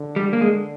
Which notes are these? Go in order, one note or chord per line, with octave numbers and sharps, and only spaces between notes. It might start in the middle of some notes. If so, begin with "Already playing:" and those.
Already playing: D3
G3
A#3
G#3